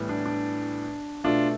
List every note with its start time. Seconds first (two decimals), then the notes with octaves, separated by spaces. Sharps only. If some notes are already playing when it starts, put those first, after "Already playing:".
Already playing: A2 E3 G3 B3
0.09 D4
0.26 D4
1.24 B2 A3 D4 F4